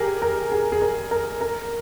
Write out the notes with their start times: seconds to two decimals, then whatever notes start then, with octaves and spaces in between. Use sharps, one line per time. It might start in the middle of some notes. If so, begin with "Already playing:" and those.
Already playing: G4 G#4 A#4
0.22 A#4
0.52 G#4
0.72 G#4
0.82 A#4
1.11 A#4
1.41 A#4